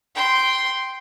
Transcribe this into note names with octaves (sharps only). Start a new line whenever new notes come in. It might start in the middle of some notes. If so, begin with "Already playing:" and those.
G5 C6